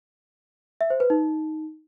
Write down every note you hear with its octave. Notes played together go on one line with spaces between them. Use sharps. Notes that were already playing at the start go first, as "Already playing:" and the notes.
E5
C5
B4
D#4